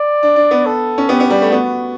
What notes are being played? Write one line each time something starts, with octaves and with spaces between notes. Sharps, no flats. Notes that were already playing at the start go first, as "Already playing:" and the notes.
Already playing: D5
D4
D4
B3
A4
C#4
B3 G4
B3
G3
A3
B3 F#4